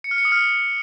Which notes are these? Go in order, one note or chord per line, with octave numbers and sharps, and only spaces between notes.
C#7
F6
C#7
D#6
F6